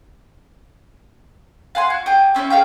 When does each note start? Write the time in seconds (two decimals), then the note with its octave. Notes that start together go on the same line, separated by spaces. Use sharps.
1.75 F5 F#5 G#5 C6
1.90 F#4
2.06 G4 G#4 G5
2.35 C4 C#4 D#4 E4
2.50 G#4 A#4 F5 G5